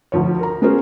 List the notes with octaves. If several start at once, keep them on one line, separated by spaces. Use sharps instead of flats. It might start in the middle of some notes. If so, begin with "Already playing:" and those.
D2 F3 C#5
A#4 A#5
B3 C#4 F#4 G#4 A#4 C5